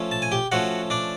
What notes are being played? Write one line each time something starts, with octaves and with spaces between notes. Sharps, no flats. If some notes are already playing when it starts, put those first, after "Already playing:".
Already playing: F3 A3 C#4
A5
G#5
G4 G5
F3 A3 C#4 F#4 F#5
D4 D5